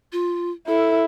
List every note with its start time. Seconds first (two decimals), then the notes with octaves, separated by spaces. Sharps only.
0.12 F4
0.68 E4 A4